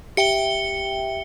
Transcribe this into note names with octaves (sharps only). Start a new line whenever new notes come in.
G4 E5 G5 C#7 G7